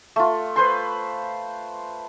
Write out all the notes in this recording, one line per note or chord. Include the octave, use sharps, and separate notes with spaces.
A3 F4
B4 C5 C6